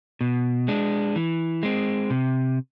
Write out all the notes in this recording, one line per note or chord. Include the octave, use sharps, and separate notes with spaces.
B2
G#3 D4
E3
G#3 C4
C3